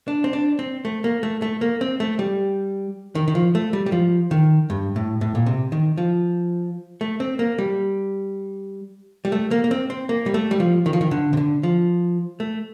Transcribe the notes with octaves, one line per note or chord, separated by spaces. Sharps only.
D4
C4
D4
C4
A3
A#3
A3
A3
A#3
C4
A3
G3
D#3
D#3
F3
A3
G3
G3
F3
D#3
G2
A2
A2
A#2
C3
D#3
F3
A3
C4
A#3
G3
G3
A3
A#3
A#3
C4
C4
A#3
G3
A3
G3
F3
D#3
F3
D#3
D3
C3
D3
F3
A3